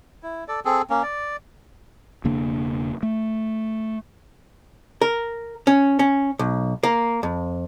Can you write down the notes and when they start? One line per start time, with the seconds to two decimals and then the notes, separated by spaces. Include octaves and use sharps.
0.23 E4
0.48 A4 D5
0.65 C4 G#4 A4
0.90 A#3 C#4
1.03 D5
2.24 E1 C#3 A#3 D4
3.03 A3
5.01 A#4
5.67 C#4
5.99 C#4
6.39 B1
6.83 A#3
7.23 F2